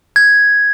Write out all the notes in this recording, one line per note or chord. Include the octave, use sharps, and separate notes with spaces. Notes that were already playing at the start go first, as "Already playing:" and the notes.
G#6